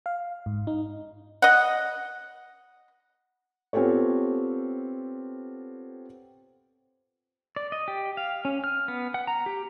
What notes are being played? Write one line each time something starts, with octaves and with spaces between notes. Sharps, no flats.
F5
G#2
D#4
D#5 F#5
B3 C4 F4 G4 A4 C#5
D5
D#5
G4
F5
C#4
F6
B3
F#5
A#5
G4